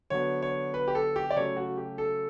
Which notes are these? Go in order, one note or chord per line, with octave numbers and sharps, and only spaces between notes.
D3 F#3 B3 C#5
C#5
B4
G4
A4
G4
D5
C#3 F#3 A3 C#5
F#4
G4
A4